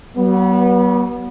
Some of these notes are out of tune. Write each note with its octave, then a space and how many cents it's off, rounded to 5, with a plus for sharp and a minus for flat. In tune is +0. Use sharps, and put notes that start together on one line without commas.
F#3 +40 B3 -25